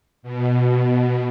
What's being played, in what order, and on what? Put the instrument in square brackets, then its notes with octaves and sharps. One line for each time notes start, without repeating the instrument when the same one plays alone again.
[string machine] B2